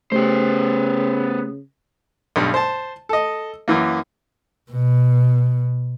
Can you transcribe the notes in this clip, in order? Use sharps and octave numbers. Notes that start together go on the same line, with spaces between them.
C#3 A3 B3 G4 C5
B1 G2
C5 A5
A4 D#5
F#2 E3 A#3
B2